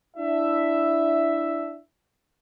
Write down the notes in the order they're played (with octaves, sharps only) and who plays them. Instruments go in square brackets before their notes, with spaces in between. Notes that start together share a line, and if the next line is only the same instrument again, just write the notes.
[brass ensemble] D4 E4 E5